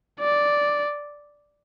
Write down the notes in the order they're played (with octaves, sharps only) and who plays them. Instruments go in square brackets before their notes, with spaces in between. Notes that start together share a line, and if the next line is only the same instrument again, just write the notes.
[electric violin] D5